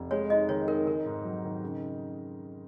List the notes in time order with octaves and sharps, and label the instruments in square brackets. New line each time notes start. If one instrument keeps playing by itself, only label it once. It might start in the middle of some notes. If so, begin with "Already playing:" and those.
Already playing: [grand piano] F1
[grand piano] G#3 [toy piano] C#5
[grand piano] D#4 [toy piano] D#5
[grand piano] D#3 [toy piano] C#5
[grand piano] D#4 [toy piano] A#4
[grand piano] D#3 [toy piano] A#4
[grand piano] G#2
F#3
D#3
C#3